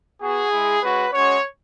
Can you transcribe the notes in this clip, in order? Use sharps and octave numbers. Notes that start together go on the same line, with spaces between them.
B3 F#4 G#4
G#3 E4
G#3 C#4 F#4 B4
G#3 C#4 F#4 C#5